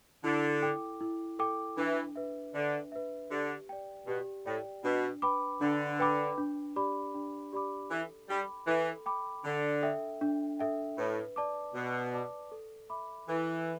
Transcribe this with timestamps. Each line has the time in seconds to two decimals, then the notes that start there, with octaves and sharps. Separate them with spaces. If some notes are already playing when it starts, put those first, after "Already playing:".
0.24 D3 E4
0.62 A4 G5 D6
1.01 E4
1.39 A4 G5 D6
1.77 E3 D4
2.16 B4 E5
2.54 D3 D4
2.92 B4 E5
3.31 D3 G4
3.69 D5 G5
4.07 B2 G4
4.46 A2 D5 G5
4.84 B2 D4
5.22 B4 G5 B5 D6
5.61 D3 D4
5.99 B4 G5 B5 D6
6.38 D4
6.76 G4 D5 B5 D6
7.14 D4
7.53 G4 D5 B5 D6
7.91 E3 A4
8.29 G3 G5 B5 D6
8.67 E3 A4
9.06 G5 B5 D6
9.45 D3 D4
9.83 A4 E5 G5
10.21 D4
10.59 A4 E5 G5
10.98 A2 B4
11.36 D5 A5 D6
11.75 B2 B4
12.13 D5 A5 D6
12.52 A4
12.90 E5 B5 D6
13.28 E3 A4